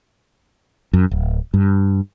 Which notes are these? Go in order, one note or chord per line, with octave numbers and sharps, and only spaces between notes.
F#2
D1
G2